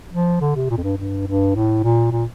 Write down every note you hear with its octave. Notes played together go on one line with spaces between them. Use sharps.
F3
D3
C3
A#2
F2
G2
G2
G2
A2
A#2
A#2